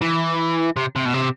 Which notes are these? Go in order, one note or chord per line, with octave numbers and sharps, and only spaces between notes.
E3
C3
C3
B2
C3